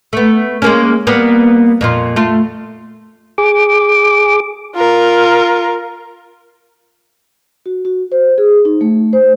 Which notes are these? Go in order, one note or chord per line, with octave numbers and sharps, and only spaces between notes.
A3 B3
G#3 A#3 C#4
G3 A#3 B3
F2 A#2 F4
A3 F4
G#4 D6
F4 A#4
F#4
F#4
C5
G#4
D#4
A3
C5